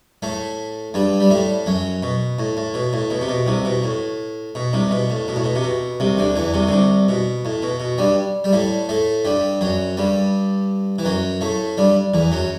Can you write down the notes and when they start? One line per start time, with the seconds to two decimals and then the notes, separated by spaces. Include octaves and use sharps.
0.22 A2 A3
0.94 G2 G3
1.20 G3
1.30 A2 A3
1.66 F#2 F#3
2.03 B2
2.39 A2
2.57 A2
2.74 B2
2.93 A2
3.10 B2
3.21 C3
3.29 B2
3.47 C2 C3
3.65 B2
3.84 A2
4.55 B2
4.73 C2 C3
4.91 B2
5.10 A2
5.28 B2
5.36 A2
5.44 B2
5.55 C3
5.63 B2
6.00 C2 C3
6.17 D2 D3
6.36 E2 E3
6.54 C2 C3
6.67 D3
6.72 C2 C3
7.09 B2
7.45 A2
7.63 B2
7.80 B2
7.98 G2 G3
8.44 G3
8.53 A2 A3
8.89 A2 A3
9.25 G2 G3
9.61 F#2 F#3
9.97 G2 G3
10.99 E3
11.05 F#2 F#3
11.41 A2 A3
11.77 G2 G3
12.14 E2 E3
12.32 F#2 F#3